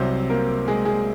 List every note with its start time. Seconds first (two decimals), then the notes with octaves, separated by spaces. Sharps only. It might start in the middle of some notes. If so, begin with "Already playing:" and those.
Already playing: C2 C3 F#3 C4 C5
0.29 A#3 A#4
0.68 G#3 G#4
0.85 G#3 G#4